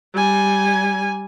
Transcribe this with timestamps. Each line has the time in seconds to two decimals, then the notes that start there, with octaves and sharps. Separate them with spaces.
0.14 G3 G#5